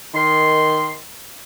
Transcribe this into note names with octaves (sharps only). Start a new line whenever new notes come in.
D#3 C6